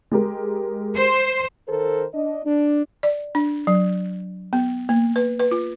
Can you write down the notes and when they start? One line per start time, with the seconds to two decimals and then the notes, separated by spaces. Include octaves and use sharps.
0.12 G#3 G4 A#4
0.96 C5
1.68 D#3 A4 A#4 C5
2.14 D4 D#5
2.46 D4
3.03 D5
3.35 D4
3.67 F#3
4.53 B3
4.89 A#3
5.16 B4
5.40 B4
5.51 F4